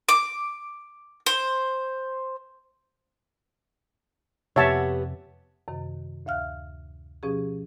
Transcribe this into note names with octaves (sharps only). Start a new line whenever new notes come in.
D6
C5
F2 C3 B3 G4 C#5 E5 F#5 A5
F#2 C3 D#3
D2 E5 F5 F6 F#6
B2 F3 C#4 G4 G#4